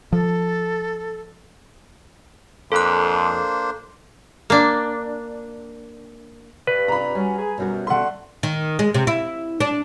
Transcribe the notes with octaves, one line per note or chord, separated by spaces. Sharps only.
F3 A4
F2 A#3 D4 A4 C5 F#6
A#3 D4
G2 B4
C3 F4 A#5 B5
F#3 G3 C#4
G#4
F#2 B2 G3 F#4
D3 A3 F#5 C6
D#3
G#3
C3
E4
D4